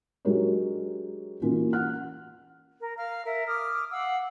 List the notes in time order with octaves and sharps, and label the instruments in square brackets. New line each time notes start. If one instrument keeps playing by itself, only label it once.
[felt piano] F#3 G#3 D4 G4 A#4 C#5
E3 A#3 C#4 F4 F#4
F#5 F6 F#6
[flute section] A#4
F5 F6
A#4 E5
D6 D#6 F6
F5 F#5 D6 E6